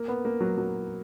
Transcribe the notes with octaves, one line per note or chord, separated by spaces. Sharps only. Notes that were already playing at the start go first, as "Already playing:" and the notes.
Already playing: A#3
B3
A#3
F#3
F#3